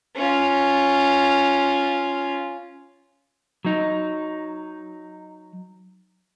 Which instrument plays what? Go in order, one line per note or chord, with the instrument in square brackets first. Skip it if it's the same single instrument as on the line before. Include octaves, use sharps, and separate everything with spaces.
[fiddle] C#4 F4
[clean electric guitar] F#3 D#4